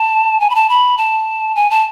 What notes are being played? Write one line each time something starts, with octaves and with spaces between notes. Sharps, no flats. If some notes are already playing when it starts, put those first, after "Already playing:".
Already playing: A5
G#5
B5
A5
B5
A5
G#5
A5